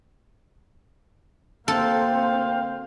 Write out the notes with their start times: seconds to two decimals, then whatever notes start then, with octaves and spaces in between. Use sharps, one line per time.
1.68 D2 A#3 C4 A4 C5 F5